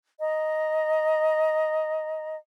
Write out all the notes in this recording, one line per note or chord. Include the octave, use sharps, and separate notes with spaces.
D#5 A#5